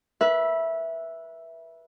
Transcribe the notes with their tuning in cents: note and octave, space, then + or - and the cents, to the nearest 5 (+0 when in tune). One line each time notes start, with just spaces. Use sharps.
B4 -25 E5 +0